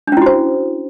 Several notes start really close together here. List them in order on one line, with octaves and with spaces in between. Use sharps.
D4 C#4 E4 F#4 C5